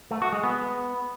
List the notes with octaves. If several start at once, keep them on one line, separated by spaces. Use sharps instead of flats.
A3
F#4
G#3
B3